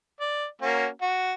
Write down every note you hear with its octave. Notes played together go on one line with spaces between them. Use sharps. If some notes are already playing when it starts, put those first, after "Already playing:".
D5
A#3 C#4 F#4
F#4